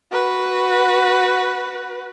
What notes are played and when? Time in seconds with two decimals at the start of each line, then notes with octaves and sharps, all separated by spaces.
0.12 F#4 B4